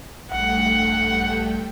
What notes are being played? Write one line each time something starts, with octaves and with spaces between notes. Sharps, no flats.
A#1 G2 A3 F#5 G5